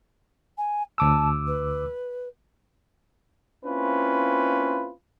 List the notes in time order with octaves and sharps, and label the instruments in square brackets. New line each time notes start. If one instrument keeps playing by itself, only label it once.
[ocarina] G#5
[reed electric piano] D2 D6 E6 [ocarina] A5
[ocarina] B4
[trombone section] A#3 C4 C#4 E4 F4 B4